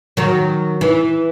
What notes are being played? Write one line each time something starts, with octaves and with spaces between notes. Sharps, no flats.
D#3 F#3
E3